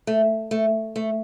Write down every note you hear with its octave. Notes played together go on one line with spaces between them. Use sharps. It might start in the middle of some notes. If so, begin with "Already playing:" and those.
A3
A3
A3